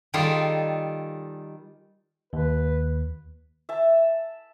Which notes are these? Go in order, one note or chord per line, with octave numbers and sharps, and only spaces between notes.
D#3 G3 D#4 F4 G#4 A4
D#2 B4
E5 A5